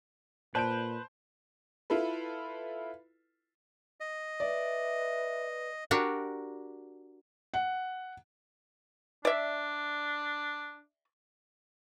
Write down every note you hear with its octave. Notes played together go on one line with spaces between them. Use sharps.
A#2 B4 C5 D5 A5 B5 G6 D7
E4 F4 A4 B4
D#5
B4 D5 E5
D4 F#4 G4 A#4
F#5
D4 D5 E5